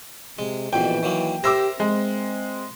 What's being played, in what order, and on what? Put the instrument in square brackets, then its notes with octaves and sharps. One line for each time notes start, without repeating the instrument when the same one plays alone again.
[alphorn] C3 [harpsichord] G#3
[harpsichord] A#1 F2 B2 [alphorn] E3 [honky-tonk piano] G5
[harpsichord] D#3 F#3 A#3
[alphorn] G4 [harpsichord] A#4 C5 E5 [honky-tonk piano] D6 E6 A#6
[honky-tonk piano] G#3 [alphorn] C4